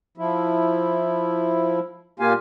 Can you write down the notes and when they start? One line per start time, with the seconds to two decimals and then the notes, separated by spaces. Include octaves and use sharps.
0.18 F3 E4
2.20 A#2 A#3 F4 G4 F5 G#5